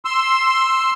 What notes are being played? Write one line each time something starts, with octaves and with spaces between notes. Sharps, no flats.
C6 E6